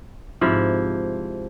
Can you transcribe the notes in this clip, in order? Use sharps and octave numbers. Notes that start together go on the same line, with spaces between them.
G#2 C3 F3 E4